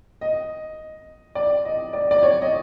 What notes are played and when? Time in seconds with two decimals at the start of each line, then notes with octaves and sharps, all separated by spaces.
0.21 D#5
1.35 D5
1.65 D#5
1.93 D5
2.11 D5
2.23 C#5
2.42 D#5